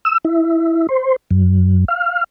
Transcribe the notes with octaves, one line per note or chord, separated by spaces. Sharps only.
E6
E4
C5
F#2
F5